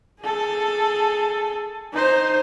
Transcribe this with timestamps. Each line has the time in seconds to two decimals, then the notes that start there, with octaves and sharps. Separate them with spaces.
0.22 G#4 A4
1.93 D#4 C5